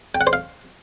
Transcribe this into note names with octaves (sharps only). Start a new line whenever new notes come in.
G5
F#5
C5
F5